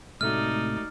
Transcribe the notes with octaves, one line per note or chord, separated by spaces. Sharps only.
A2 C3 G#3 A3 D#4 F#4 D5 F6